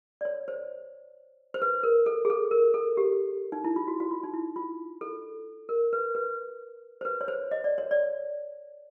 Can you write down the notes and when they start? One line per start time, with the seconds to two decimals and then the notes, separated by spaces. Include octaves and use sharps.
0.21 D5
0.25 C#5
0.48 C5
1.54 C5
1.62 B4
1.83 A#4
2.06 A4
2.25 G#4
2.30 A4
2.51 A#4
2.74 A4
2.97 G4
3.52 D#4
3.64 E4
3.76 F4
3.88 F#4
4.00 F#4
4.11 F4
4.24 D#4
4.34 E4
4.56 F4
5.01 A4
5.69 A#4
5.93 B4
6.15 B4
7.01 C5
7.05 B4
7.21 C#5
7.28 C5
7.51 D#5
7.64 D5
7.78 C#5
7.91 D5